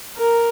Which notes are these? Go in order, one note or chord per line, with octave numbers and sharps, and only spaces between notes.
A#4